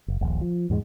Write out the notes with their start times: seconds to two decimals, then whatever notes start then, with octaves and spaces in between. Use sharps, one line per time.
0.08 F#1
0.21 D#1 A#1
0.41 F3
0.70 E2 G#2 F3 G#3